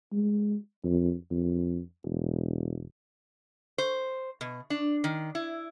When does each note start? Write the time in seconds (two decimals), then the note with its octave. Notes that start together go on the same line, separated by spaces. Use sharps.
0.13 G#3
0.84 F2
1.31 F2
2.05 E1
3.78 C5
4.41 B2
4.70 D4
5.04 D#3
5.35 E4